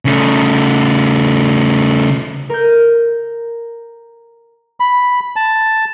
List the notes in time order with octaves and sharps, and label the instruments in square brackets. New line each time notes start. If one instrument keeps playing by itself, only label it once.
[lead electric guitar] C#3 A3
[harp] A#4 G6
[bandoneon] B5
A5